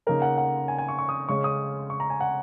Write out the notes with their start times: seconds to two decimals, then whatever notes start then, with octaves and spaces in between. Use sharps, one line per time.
0.07 C#3 A#3 D#4 A#4
0.22 F#5
0.38 F#5
0.68 G#5
0.78 G#5
0.88 C#6
0.98 C#6
1.09 D#6
1.29 C#3 G#3 C#4 C#6
1.44 D#6
1.90 C#6
2.00 A#5
2.10 G#5
2.21 F#5